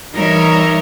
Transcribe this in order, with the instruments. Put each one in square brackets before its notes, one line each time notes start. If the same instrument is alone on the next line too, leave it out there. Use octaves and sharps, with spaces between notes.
[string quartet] E3 G3 D#4 A#4 C#5 E5